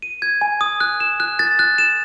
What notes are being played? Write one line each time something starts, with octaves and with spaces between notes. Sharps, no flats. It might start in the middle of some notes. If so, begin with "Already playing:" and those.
D#7
G#6
G#5
D#6
F#6
E7
F#6
A6
F#6
E7